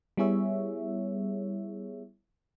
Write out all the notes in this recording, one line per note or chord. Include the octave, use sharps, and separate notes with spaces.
G3 B3 E4 G#4 C#5 E5